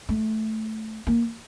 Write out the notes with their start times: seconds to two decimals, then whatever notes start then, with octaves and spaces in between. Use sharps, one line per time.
0.09 A3
1.07 A#3